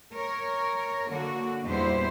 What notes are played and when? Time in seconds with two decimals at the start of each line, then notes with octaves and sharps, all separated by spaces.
0.14 A#4 C#5
1.08 D3 A#3 F#4
1.64 E2 A#2 G3 B3 E4 C5